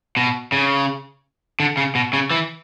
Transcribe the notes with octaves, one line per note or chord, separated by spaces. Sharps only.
B2
C#3
D3
C#3
B2
C#3
E3